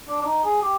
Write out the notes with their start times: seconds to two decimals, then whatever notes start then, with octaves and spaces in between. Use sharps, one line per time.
0.07 D4
0.21 D4
0.25 D#4
0.44 G#4
0.62 G4